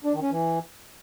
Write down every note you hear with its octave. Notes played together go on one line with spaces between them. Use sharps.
D4
D#3
C#4
E3